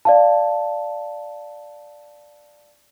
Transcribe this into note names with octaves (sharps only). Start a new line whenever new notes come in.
D5 F5 A5